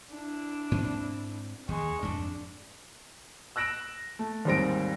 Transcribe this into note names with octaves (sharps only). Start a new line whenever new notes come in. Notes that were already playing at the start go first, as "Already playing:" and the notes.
D4 E4
G#2 C4
D#2 G#3 C#6
F2 G#2 D4
E6 F#6 A#6 D7 E7 F#7
A3
D#2 G#2 G3 C4 A#6 D7